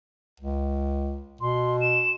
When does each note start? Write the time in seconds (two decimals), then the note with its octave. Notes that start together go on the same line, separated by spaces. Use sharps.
0.40 C#2
1.41 B2 C6
1.81 E7